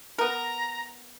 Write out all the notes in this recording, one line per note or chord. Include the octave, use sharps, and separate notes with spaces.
B3 A#4 A#5